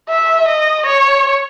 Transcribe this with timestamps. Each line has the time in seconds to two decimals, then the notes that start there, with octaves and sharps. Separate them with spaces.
0.09 E5
0.48 D#5
0.86 C#5